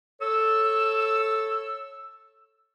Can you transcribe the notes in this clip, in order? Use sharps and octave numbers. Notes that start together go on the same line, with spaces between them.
A4 C#5 E6